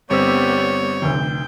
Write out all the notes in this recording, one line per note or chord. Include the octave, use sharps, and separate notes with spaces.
G1 G3 B3 C4 C#5 E6
F1 D2 G5